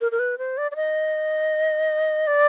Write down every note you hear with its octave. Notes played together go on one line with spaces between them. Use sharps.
A#4
A#4
B4
C5
D5
D5
D#5
D5